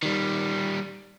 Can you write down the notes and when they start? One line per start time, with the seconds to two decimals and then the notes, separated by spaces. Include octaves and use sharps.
0.03 D#3 G3